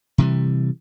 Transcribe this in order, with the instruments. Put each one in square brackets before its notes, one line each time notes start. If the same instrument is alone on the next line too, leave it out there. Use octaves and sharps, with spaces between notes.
[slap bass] C3 E3 G3